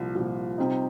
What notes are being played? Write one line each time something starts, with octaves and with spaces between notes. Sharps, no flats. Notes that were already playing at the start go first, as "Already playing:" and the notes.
Already playing: C2 A#2 F3
C2 A#2 F3
C3 G3 C4 D#4